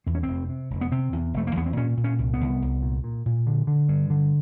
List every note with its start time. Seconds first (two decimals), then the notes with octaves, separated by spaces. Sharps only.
0.06 E2 C4
0.15 C#4
0.23 C4
0.28 F1
0.49 C3
0.70 F1
0.81 B3
0.91 C3 C4
1.13 E2
1.34 F1 A3
1.47 A#3
1.56 E2 B3
1.66 C4
1.77 A#2 C#4
1.97 A#2
2.04 C#4
2.18 C2
2.33 B3
2.41 C2
2.62 C2
2.82 A#2
3.04 A#2
3.26 A#2
3.47 D3
3.67 D3
3.89 G2
4.10 D3